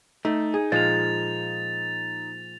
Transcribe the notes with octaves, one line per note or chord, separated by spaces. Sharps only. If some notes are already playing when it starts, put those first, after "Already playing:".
A3 D#4
G#4
A#2 F3 G#3 A6 F7